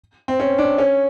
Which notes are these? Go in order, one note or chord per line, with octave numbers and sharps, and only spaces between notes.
C4
C#4
D4
C#4